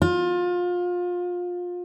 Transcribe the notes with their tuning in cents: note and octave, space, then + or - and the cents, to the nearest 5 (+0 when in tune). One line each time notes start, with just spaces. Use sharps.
F4 +25